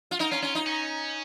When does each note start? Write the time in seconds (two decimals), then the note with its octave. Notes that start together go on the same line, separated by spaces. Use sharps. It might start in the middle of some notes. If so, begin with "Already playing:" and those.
0.11 F4
0.20 D#4 A#4
0.31 C#4 F4
0.42 C#4 F4
0.55 D#4
0.66 C#4